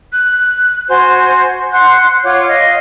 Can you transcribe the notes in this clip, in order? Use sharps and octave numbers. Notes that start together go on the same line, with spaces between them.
F#6
F#4 C5 G#5 G6
F#5 C6 F#6 G6
F4 C#5 F#5 D6
D#5 F5